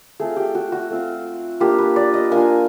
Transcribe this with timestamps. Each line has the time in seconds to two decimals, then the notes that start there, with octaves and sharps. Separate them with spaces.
0.20 A3 C4 F4 G#4
0.36 G4
0.55 F#4
0.72 F#4
0.90 A3 C4 F4
1.60 A#3 D4 F4 G4
1.78 B4
1.96 D5
2.14 D#5
2.31 A#3 D4 F4 G#5